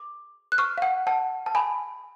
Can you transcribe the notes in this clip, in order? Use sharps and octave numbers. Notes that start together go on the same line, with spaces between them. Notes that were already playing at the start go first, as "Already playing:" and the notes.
Already playing: D6
F#6
C#6 F6
F5
F#5
F#5 A5
A5
G#5 B5